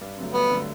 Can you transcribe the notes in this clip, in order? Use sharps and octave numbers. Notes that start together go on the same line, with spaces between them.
G2
D3 F#3 A3
G2 B3
D3 F#3 A3